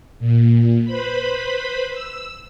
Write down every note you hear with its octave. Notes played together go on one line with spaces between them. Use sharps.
A#2
B4 C5 B5
E6